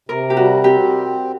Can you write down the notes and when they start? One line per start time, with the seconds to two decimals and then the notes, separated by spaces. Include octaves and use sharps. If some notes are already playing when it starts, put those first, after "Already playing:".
0.09 C3 A#4
0.30 G4
0.36 G3 F#4
0.64 C4 G4